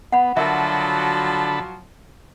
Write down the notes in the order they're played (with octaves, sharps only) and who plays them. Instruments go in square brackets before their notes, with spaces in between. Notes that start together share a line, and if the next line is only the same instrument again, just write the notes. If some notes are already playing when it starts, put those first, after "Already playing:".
[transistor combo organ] B3 [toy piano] F#5 B5
[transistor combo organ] D3 A5 B5 [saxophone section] F3 F#3 [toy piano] A#4 E5